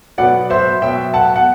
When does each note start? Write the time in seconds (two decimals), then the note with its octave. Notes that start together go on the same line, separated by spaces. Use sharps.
0.18 B2 F#3 B3 D5 F#5
0.50 C5 E5
0.82 B2 F#3 B3 E5 G5
1.14 F#5 A5
1.36 F#5